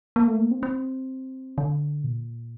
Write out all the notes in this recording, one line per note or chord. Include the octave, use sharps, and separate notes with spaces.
A#3
A3
A#3
C4
C4
D3
A#2